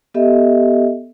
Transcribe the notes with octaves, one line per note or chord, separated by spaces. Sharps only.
B3 G4 A4 D#5 E5